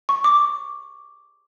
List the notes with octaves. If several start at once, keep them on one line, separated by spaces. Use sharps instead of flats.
C#6
D6